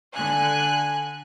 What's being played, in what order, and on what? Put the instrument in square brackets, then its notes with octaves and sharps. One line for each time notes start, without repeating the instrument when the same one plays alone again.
[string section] D3 G#5 F#6